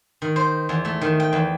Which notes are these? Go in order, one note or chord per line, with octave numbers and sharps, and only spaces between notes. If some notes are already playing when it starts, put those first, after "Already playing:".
D#3
C5
E2
A3
D#3
G5
E2